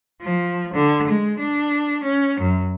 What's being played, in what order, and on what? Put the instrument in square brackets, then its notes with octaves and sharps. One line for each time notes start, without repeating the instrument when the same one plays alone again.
[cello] F3
D3
G#3
D4
C#4
F#2